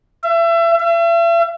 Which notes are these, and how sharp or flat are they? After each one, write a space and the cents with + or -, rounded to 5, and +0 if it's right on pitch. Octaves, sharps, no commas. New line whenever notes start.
E5 +30
E5 +40